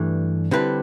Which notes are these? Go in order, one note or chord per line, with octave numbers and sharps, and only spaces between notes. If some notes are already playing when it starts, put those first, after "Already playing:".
Already playing: G2 E3 A3 D4
D3 G3 C4 E4 B4